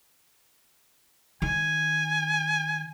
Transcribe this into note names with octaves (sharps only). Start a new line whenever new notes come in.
D#3 G#5